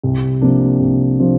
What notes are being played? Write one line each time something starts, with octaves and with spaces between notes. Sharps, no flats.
C2
C3 F3 A#3 D4
C2
C3 F3 A#3 D4